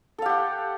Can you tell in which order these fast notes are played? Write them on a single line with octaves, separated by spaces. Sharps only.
A4 F5 G4 F#5